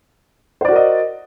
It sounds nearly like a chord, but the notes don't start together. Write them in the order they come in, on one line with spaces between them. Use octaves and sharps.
C5 D5 F#4 A#4 D#5